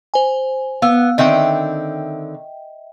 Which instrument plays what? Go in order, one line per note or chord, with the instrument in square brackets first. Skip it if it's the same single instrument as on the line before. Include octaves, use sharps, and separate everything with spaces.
[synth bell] C5 G#5
[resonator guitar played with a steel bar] B3 [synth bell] F5 E6
[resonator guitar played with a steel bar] D3 D#3 C4 [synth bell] D#5 E5 G5